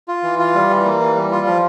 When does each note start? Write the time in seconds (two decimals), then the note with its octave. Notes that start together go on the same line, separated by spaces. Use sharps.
0.08 F4
0.23 E3
0.39 F4
0.55 G3
0.70 E3
0.85 A#3
1.00 E3
1.16 G3
1.31 F4
1.46 F3